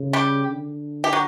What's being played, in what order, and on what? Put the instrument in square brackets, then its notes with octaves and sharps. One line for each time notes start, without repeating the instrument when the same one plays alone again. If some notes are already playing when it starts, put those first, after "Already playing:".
Already playing: [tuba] C#3
[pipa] G3 G4
[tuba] D3
[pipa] G4
F#3